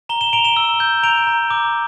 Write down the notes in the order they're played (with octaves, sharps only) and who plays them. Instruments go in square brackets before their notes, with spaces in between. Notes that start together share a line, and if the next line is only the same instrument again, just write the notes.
[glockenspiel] A#5 E7 G7
E7 G7
A#5 D7 F7
E7 G7
E6
G6
A#5 D7 F7
A#5
D6